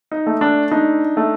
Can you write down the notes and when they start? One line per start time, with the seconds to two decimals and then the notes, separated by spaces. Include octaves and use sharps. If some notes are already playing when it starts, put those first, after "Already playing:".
0.11 D#4
0.26 A3
0.41 D4
0.71 D4 D#4
1.17 A3